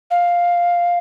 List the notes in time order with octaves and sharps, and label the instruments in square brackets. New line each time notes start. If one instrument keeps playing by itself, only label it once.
[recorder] F5